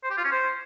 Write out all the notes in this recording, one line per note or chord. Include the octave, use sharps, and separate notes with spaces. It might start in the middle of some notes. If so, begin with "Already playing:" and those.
C5
G4
F4
C#4
C5